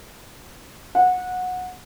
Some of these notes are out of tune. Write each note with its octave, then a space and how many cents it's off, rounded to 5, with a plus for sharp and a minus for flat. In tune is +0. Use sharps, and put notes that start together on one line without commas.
F#5 -20